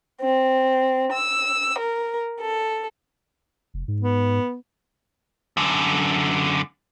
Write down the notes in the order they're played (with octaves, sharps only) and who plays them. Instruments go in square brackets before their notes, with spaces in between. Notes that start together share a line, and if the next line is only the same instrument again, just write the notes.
[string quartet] C4
E6
A#4
A4
[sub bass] F1
G#2
[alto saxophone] B3
[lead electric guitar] F#2 D3